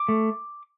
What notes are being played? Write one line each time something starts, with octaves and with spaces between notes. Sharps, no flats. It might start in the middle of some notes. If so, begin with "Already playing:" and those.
Already playing: D6
A3